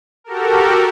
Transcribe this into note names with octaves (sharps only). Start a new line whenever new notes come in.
F#4 G4 A4 A#4